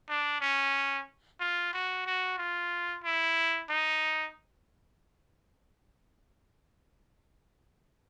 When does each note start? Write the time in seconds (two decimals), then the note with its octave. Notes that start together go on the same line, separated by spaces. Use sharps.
0.09 D4
0.41 C#4
1.40 F4
1.73 F#4
2.06 F#4
2.38 F4
3.04 E4
3.70 D#4